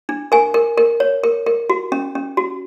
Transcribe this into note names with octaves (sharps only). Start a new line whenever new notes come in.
D4
A#4 G#5
A#4
A#4
C#5
A#4
A#4
F#4
C#4
C#4
F#4